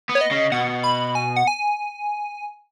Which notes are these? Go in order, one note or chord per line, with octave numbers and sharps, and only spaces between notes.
B3
C#5
D#5
C#3
B2 F#5
B5
G#5
F#5
G#5